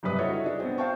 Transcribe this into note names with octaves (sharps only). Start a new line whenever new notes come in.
F#1 G2 C3 D4 B4 D#6
E4 F#4 A4 C#5 D#5 E5
D4 G#4
B3 C4
C5 F5 G5 A5 C#6